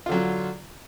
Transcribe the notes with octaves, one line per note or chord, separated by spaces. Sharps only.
D3 F#3 F4